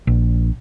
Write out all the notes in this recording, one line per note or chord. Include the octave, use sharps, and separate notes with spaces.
A#1